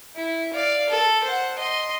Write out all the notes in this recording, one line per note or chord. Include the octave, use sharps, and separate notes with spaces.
E4
D5 F5
A4
C5 F#5
D#5 C6